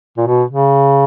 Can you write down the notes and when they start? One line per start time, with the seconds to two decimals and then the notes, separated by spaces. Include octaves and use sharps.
0.17 A#2
0.27 B2
0.50 C#3